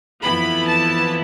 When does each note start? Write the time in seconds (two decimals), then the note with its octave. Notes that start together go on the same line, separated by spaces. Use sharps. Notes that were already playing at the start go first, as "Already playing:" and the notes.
0.22 F2 E3 B3 E4 B5
0.65 A5